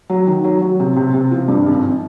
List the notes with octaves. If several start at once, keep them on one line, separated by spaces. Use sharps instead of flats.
F#3
D#3
F#3
F#3
C3
C3
C3
F3
G2
G#1